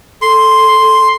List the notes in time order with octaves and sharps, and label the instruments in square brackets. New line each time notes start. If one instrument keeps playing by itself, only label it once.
[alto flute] A4 [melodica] C6